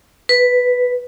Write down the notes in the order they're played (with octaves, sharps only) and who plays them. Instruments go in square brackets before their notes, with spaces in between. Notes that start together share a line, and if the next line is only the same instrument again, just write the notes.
[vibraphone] B4